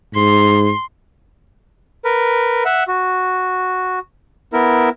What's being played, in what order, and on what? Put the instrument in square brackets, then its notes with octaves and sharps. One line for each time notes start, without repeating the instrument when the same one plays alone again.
[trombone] G#2 [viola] C6
[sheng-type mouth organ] A#4 B4
E5 F#5
F#4
B3 E4 A#4